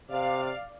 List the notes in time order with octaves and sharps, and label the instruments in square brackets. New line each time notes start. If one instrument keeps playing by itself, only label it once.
[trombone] C3 [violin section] D5 F5